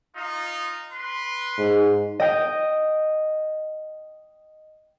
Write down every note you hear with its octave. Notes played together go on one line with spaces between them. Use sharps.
D#4 F4
B4 C6
G#2
D#5 G5